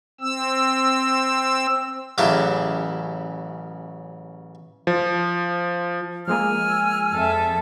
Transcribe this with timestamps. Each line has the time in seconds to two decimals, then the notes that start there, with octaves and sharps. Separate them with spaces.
0.21 C4 E6
2.18 A1 C#3 F#3 E4 G4 A5
4.87 F3
6.28 F3 G#3 A#3 G#5 E6 F6
7.12 F2 A4 E5